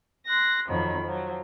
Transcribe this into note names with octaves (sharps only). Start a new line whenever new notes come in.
C6 F#6 A#6
F2 D#3 F3 F#3 B5
F3 F#3